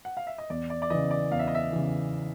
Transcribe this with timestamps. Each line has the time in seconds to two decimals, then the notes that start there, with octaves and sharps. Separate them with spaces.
0.05 F#5
0.17 F5
0.27 E5
0.38 D#5
0.50 E2 D5
0.70 D5
0.82 D5
0.90 C#3 E3 D#5
1.11 D5
1.31 E2 F5
1.39 E5
1.48 D#5
1.55 E5
1.72 C#3 E3